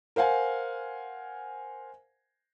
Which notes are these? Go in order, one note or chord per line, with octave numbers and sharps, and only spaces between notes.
A#4 C5 F5 F#5 G#5